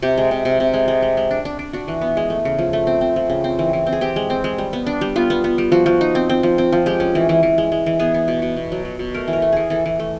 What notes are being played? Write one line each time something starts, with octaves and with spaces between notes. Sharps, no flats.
C3 G4
G#3
C3
C3
C3
G#3
G#3
G#3
G#3
D4
D4
D4
D4 F#4
E3
B3
G#3
A3
C#3
F3
A3
C4
C4
F3
C#3
C4
E3
E3
C4
G#4
C4 G4
G#3
C4
G#3
G3
B3
D4
G3
B3 F4
B3
B3
G3
F3 F#4
F3
D#4
C4
C4
F3
C4
F3
G#3 G4
C#4
E3
E3
E3
G#3
G#3
E3
B3 G#4
B3
B2
B2
B2
F#3
F#3
B2
A3 A#4
E3
A#4
A3
E3 G#4
E3 A4
E3
A3